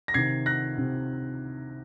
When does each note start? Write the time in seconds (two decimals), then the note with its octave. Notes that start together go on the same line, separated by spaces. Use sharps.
0.08 A#6
0.14 C3 D#3 G#6 C7
0.46 F#6 A#6
0.78 C3 D#3